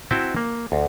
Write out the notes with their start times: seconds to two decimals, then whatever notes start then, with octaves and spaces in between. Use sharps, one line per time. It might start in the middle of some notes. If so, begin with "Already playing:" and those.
0.11 C4 E4 F#4 E5 G5 A5
0.36 A#3
0.72 D2